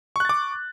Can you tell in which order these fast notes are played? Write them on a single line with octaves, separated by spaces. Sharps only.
C#6 F#6 A6 D6